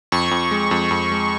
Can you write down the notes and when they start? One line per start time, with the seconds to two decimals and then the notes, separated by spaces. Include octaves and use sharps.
0.12 F2 C#6
0.31 F2
0.51 G#3
0.71 F2
0.91 F2
1.12 G#3